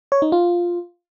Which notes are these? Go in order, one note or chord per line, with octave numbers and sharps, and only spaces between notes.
C#5
D#4
F4